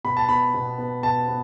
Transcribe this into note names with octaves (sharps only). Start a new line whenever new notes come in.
B2 B5
A5
B3 B5
B2
B3
B2 A5
B3